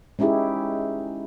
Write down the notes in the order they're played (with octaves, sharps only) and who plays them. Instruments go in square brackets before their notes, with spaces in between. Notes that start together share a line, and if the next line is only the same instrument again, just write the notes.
[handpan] G#3 C#4 D#4 E4 G4 G#4